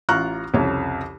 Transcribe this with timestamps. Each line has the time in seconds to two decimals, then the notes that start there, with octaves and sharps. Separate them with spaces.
0.09 A1 F4 A#5 C#6 F6 F#6
0.54 C2 F2 C#3 C#5